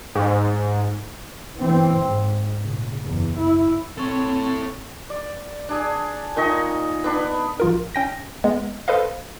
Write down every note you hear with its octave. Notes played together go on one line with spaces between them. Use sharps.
G#2
E3 C4
G#2
A#2 C#3
F#1 E2
E4
C4 A4 C#5
D5
D4 G#4 G#5
A#2 D#3 D#5 C#6
B3 D4 B4
A#1 F4 A#4
C#4 G5 A#6
G#3 B3
A4 B4 C5 D#5 F5